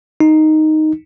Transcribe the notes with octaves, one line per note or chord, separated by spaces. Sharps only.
D#4